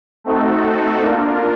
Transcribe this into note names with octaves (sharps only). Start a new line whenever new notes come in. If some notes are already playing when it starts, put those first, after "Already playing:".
A3 C4 D#4 F#4 A4
A#3 D4 F4 A#4